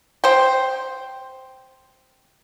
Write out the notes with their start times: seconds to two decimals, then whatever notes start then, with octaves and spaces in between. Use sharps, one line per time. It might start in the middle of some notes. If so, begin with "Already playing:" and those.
0.24 C5 G5